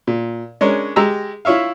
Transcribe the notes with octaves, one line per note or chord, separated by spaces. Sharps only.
A#2
G#3 C#4 D4 A#4 C#5
G#3 G4 A#5 E6
E4 F4 C#5 E5 F5